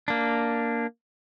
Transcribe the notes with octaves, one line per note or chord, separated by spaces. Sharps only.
A#3 D4